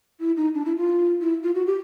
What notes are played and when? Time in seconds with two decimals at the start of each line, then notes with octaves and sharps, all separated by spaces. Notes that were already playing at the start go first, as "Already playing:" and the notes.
0.20 E4
0.37 D#4
0.54 D4
0.65 E4
0.76 F4
1.21 E4
1.43 F4
1.55 F#4
1.66 G4